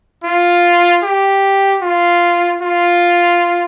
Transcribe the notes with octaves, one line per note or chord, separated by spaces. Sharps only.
F4
G4
F4
F4